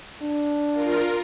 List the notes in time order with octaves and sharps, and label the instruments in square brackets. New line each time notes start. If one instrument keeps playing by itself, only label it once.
[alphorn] D4
[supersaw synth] F4 A#4